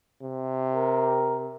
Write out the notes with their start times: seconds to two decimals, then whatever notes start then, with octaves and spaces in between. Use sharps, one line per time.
0.22 C3
0.74 A#4